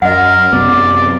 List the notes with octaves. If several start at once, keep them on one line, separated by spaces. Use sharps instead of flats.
F#2 A#4 D#5 F#5
F#2 C3 B3 D5